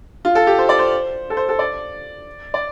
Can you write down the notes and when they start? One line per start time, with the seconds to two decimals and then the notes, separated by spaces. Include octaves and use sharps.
0.25 F4
0.35 A4
0.47 G4
0.59 C5
0.69 D5
0.79 C5
1.30 A4
1.37 C5
1.49 A4
1.59 D5
2.54 D5